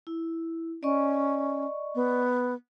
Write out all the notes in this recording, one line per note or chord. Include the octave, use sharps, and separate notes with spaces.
E4
C#4 D5 D#5 C#6
B3